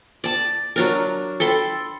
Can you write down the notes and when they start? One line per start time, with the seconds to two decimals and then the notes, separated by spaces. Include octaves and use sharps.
0.24 D5 A5
0.76 F#3 D4 A#4
1.40 A4 G5 B5 C6